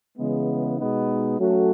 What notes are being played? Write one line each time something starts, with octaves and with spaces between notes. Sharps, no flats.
C#3 E3 G#3 B3
B2 G#3 B3 D#4
F#3 A3 C#4 F#4 A4